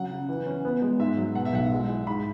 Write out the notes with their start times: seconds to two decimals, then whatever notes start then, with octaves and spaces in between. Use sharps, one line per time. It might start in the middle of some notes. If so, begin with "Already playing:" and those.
Already playing: C#3 F#3 F#5
0.11 C#3
0.29 E3
0.46 C#4
0.65 B3
0.82 G#3
1.00 G#2 E5
1.18 F#3
1.35 B2 F#5
1.45 E5
1.53 B1 F#5
1.72 G#3
1.89 E4
2.07 G#2 B5